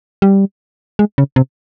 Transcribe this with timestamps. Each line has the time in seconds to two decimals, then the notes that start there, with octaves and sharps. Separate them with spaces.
0.22 G3
0.99 G#3
1.18 C#3
1.36 C3